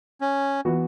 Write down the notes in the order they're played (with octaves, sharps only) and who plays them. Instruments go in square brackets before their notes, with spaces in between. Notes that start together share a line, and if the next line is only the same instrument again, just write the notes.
[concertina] C#4
[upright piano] E3 B3 F#4